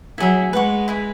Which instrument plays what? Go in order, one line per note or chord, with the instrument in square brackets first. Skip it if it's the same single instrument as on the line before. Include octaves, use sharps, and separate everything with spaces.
[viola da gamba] F#3 [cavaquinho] E4 G#4 E5
[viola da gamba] G#3 [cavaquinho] B4 F#5 C#6
[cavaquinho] E4 G#4 B4